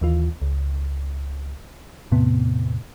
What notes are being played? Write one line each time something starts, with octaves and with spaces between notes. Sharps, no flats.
D#2 E3 F4
C#2
E2 A2 C3 B3